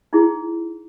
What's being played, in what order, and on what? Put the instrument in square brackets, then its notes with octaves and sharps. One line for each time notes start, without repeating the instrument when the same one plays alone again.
[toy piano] D#4 E4 G#4